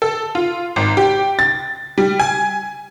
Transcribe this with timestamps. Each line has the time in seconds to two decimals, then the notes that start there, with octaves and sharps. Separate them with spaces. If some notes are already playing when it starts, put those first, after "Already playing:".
0.02 A4
0.35 F4
0.76 G#1
0.97 G4
1.39 A6
1.98 G3
2.20 G#5